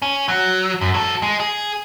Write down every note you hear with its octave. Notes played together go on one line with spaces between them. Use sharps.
C#4
F#3
F#2
F#3 A4
G#3
G#4